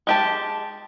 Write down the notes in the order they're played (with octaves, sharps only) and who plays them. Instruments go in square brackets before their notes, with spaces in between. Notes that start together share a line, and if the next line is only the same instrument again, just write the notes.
[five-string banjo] G#3 G4 A5